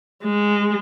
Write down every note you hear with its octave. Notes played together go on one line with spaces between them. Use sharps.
G#3